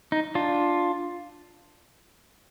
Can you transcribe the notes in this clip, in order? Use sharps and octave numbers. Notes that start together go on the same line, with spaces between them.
D#4
D4 F4